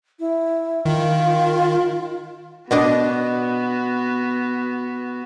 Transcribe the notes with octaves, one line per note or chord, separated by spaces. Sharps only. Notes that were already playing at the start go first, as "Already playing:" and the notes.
E4
D#3 F4
B2 B3 D4 F#4 D#5